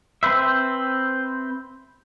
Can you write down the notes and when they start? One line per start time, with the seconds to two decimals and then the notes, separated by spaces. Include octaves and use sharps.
0.23 C4 B4 C5 E5